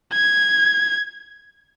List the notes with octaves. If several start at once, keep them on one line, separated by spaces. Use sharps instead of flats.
G#6